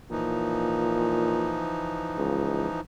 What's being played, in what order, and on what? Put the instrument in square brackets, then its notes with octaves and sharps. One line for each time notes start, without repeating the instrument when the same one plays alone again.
[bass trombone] A#2 [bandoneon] E3 F3 D#4
[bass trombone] C#2